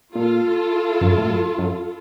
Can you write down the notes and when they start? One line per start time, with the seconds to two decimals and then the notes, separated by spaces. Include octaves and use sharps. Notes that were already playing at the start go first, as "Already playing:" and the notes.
0.15 A#2 F4 A4
1.01 F#2
1.18 A2
1.30 F#2
1.58 F#2